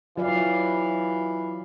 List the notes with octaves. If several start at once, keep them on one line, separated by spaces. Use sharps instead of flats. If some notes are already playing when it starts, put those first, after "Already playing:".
E3 F#3 F4 D5 F5